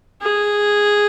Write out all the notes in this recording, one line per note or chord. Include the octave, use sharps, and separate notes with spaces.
G#4